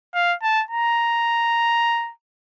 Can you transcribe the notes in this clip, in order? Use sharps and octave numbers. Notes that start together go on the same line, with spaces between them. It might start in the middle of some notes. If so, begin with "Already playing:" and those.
F5
A5
A#5